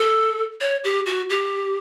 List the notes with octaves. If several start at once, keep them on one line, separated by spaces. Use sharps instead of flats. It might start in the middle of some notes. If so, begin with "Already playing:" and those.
Already playing: A4
C#5
G4
F#4
G4